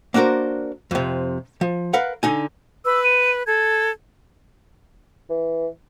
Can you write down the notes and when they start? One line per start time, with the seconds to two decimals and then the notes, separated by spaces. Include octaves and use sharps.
0.14 A#3 D4 F#4 A#4 C5
0.91 F2 C3
1.61 F3
1.93 A#4 B4 F5 F#5
2.23 D3 D#4 G#5
2.85 B4 E6
3.04 D#7
3.47 A4 G#6
5.29 E3